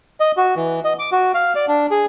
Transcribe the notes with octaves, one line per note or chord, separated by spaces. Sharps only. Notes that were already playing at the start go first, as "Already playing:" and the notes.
D#5
F#4
E3
D#5
D6
F#4
F5
D5
D4
G#4